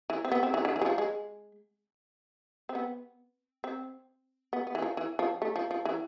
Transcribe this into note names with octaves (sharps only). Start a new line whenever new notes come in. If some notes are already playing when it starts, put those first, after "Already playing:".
E3
C4
B3
C4
E3
D3
E3
G#3
F3
G#3
C4
B3
C4
B3
B3
E3
F3
E3
F3
A3
F3
F3
E3